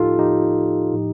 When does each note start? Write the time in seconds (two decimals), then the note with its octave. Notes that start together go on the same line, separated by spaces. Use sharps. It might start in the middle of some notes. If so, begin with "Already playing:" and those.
Already playing: A2 F3 D#4 F4 G4 A4
0.19 A2 F3 D#4 G4
0.94 A2 F3